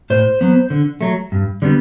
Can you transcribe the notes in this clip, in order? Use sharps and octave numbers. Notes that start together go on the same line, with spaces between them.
A2 C5
F#3 B3
D3
F#3 A3
G2
D3 G3 B3